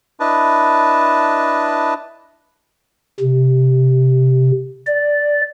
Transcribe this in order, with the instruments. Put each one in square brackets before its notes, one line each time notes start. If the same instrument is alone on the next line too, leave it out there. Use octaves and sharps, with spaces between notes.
[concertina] D4 E4 B4 D#5 A5
[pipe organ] C3
D5